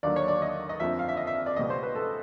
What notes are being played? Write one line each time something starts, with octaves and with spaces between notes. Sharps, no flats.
D#2 D3 F#3 D5
C#5
D5
D#5
D#5
F2 D3 F3 E5
F5
E5
D#5
E5
D5
C#2 B2 G3 D#5
C5
B4
A4